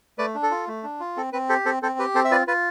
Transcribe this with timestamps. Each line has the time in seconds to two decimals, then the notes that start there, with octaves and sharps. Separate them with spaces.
0.18 A3 B4 D5
0.35 D4
0.43 A4
0.51 F4
0.68 A3
0.83 D4
1.00 F4
1.17 C4 A4
1.33 C4 B4
1.49 G4 A4 C5
1.65 C4 A4 C5
1.83 C4 A4 C5
1.99 G4 B4
2.15 C4 A4 C5
2.25 E5
2.31 F4 B4 D5
2.48 F4 B4